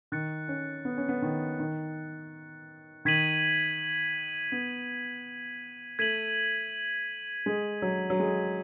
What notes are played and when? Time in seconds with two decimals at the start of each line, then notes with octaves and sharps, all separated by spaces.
0.12 D#3 F#6 A6 C#7
0.48 C#4
0.85 B3
0.98 C#4
1.09 B3
1.22 D#3
1.59 D#3
3.05 D#3 G#6 B6 D#7 F#7
4.52 B3
5.99 A3 G#6 B6 D#7 F#7
7.46 G#3
7.82 F#3
8.10 F#3
8.20 G#3